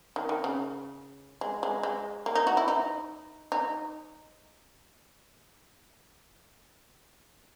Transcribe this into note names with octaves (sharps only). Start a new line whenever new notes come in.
D#3
D#3
C#3
G#3
G#3
G#3
A#3
D#4
F#4
E4
D#4
D#4